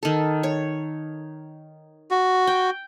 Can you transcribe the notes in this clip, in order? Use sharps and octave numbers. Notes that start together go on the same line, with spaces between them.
D#3 A4
C#5
F#4
G5